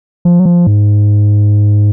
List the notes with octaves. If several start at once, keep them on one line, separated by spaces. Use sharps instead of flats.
F3
F#3
F3
G#2